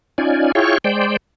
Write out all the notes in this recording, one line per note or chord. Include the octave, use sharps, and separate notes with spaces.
C#4 D#4 F4 D5 G#5
E4 F4 G#4 C#5 G5 C#6
G#3 C5 D5 G5